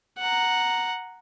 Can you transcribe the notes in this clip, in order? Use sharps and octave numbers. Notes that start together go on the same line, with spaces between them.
F#5 A#5